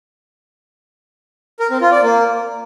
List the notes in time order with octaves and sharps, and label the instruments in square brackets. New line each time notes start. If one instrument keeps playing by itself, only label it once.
[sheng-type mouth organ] A#4
C4
F4
D5
A#3